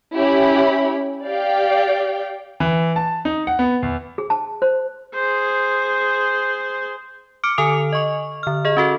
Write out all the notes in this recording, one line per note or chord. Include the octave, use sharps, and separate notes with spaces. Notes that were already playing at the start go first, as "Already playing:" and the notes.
C#4 E4 G4 B5
G4 D5 F5 G5
E3
A5
D#4
F#5
B3
E2
G#4
A5
C5
G#4 C5
D6 F6 C#7 D7
D3 A4 G#5 D#6 F7
D#5 C#6
D3 F6
G#4 D#5
C#4 F#4 A4